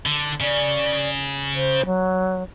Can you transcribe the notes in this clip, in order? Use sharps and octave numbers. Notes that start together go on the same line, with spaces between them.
D3
C#3 C#4 D5
C5
F#3